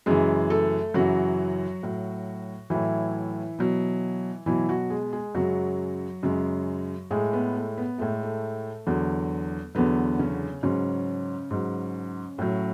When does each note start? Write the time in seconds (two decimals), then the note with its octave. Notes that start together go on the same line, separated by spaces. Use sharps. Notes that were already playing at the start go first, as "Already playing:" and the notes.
0.06 F#2 C#3 E3 G#3 G#4
0.50 A3 A4
0.94 F#2 C#3 E3 F#3 F#4
1.83 A2 F#3
2.70 A2 E3 F#3 E4
3.59 B2 F#3
4.46 B2 E3 F#3 E4
4.69 F#3 F#4
4.90 G#3 G#4
5.13 G#3 G#4
5.35 F#2 C#3 F#3 G#3 F#4
6.23 F#2 C#3 G#3
7.11 A2 G#3 G#4
7.33 B3
7.55 A3
7.77 B3
7.98 A2 G#3 A3
8.23 A3
8.87 E2 D3 F#3
9.75 E2 D3 F#3 B3
10.19 C#3 C#4
10.63 G#2 C#3 F#3 C#4
11.51 G#2 F#3
12.38 A2 F#3